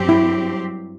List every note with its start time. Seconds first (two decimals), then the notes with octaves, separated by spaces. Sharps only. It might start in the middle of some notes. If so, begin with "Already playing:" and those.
Already playing: G2 F#3 C4 G4
0.09 E4